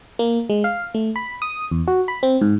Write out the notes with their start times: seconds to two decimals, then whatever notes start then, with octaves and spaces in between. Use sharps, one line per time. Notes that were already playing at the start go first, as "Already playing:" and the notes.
0.19 A#3
0.50 G#3
0.64 F5
0.94 A3
1.16 B5
1.42 D#6
1.71 E2
1.87 F#4
2.08 B5
2.23 C4
2.41 G#2